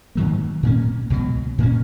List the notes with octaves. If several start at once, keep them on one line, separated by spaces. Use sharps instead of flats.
G#2 D#3 F#3 A#3
A#2 A#3 C#4
C#2 B2 F#3
A#2 A#3 C#4